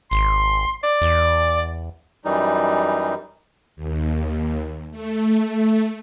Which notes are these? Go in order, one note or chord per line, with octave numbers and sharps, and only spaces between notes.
G#1 C6
D5
E2
F#2 E3 G3 D#4
D#2
A3